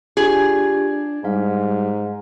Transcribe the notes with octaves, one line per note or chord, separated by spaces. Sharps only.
D4 F4 G4 G#4
G#2 G3 F5